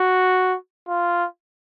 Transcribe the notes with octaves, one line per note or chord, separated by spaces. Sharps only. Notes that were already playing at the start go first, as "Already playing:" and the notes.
Already playing: F#4
F4